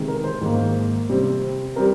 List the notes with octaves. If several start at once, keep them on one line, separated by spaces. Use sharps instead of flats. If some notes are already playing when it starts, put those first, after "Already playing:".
Already playing: C3 D#3 G#3 C4
A#4
C5
G#2 D#3 A#3
C3 G3 C4
G3 C4 A#4